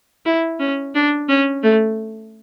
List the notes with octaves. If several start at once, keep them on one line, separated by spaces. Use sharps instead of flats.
E4
C#4
D4
C#4
A3